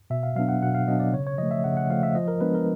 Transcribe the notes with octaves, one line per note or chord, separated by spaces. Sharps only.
B2 E5
F5
F#3 B3 D4 F5
F#5
B2 F#5
F5
F#3 B3 D4 D#5
D5
C#3 C#5
C#5
F3 A3 D#5
E5
C#3 F#5
F#5
F3 A3 F5
E5
F3 D#5
A#4
G#3 B3 D4 B4
A#4